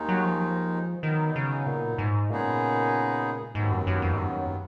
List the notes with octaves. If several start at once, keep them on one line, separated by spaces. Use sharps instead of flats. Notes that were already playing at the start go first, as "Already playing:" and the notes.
Already playing: D#2 D#3 G#3 D#4
F#3
F3
D#3 F#3 B3 D#4
C#3
A#2
G#2
A#2 C#3 G#3 B3 D#4 G#4
D#2 G#2 D#3 F#3 B3
F#2
F#2
F2
G#2
F#2